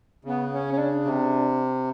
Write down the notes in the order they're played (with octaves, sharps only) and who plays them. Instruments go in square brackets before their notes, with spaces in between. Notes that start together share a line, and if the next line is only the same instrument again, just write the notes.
[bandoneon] C#3 [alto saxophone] B3
[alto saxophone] C#4
C#4
D4
[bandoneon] C3